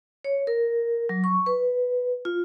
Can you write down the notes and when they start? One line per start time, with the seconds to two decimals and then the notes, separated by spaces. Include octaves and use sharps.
0.25 C#5
0.47 A#4
1.09 F#3
1.24 C#6
1.46 B4
2.25 F4